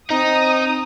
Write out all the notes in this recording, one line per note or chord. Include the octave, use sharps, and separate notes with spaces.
C4 D#4 A#5 D#6